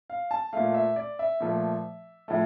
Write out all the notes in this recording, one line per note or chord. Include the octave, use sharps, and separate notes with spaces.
F5
A5
A#2 A3 F5
E5
D5
E5
A#2 F3 A3
A2 F3 A3